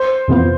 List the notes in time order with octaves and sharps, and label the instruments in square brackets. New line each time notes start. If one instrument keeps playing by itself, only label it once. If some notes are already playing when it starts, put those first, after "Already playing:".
Already playing: [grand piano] C5
[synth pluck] F2 C3 E3 B3 F4